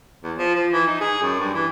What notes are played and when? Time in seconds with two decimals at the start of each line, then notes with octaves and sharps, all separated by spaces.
0.23 E2
0.37 F3
0.55 F3
0.72 E3
0.87 D#4
1.00 G#4
1.22 F#2
1.39 G2
1.54 E3